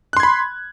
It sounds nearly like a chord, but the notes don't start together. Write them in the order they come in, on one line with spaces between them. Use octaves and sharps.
F#6 C6 G#6 B5